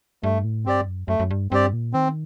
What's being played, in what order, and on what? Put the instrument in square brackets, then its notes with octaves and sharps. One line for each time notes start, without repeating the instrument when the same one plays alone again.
[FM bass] G2 [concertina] A3
[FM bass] A2
[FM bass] G2 [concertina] C4 G4 D5
[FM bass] F#2
[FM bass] F#2 [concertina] A3
[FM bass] F#2
G2
[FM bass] G2 [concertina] C4 G4 D5
[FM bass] A#2
[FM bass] D#3 [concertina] C4